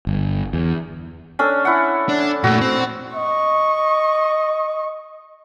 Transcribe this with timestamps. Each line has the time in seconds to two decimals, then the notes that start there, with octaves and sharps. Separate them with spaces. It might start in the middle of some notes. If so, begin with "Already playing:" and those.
0.07 G1
0.53 E2
1.39 C#4 D4 A4
1.65 E4 F#5
2.09 D4
2.44 A#2 A3 F#4
2.61 C4
3.15 D#5 C#6